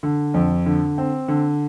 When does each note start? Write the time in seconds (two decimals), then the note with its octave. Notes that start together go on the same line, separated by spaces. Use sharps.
0.03 D3
0.34 F2
0.66 D3
0.98 C4
1.28 D3